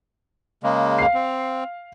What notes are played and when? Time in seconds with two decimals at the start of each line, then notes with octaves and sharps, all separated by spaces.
0.63 C#3 G#3 A#3
0.99 F5 C7
1.14 C4